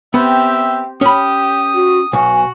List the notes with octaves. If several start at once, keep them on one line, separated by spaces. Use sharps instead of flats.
B3 C4 G4 E5
C#4 G4 B5 D#6
F#4
B1 F#4 G#5